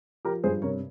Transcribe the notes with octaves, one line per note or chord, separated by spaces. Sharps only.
F3 G4 A#4
G2 G#4 C5
C3 A#4 C#5